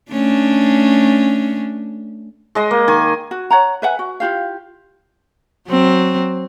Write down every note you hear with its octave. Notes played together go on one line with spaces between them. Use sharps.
A3 C#4 D4
G#3 D#5 C6
A#3
D#3 G#5
F#4
C#5 F#5 A#5
B4 E5 F#5 G#5
F#4
E4 F4 G4 F5
F#3 C4